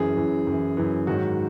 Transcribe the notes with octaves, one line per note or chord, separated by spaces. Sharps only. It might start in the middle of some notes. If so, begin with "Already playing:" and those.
Already playing: F#2 E3 G#4
F#2 E3
F#2 E3
F#2 E3
G#2 D#3 F#3 F#4